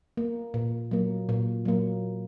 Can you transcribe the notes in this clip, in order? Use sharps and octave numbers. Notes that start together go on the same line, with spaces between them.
A#3
A#2
F#3 A#3
A#2
F#3 A#3